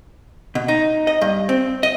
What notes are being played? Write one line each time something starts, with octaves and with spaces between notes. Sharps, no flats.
B2
D#4
D#5
G2
C4
D#5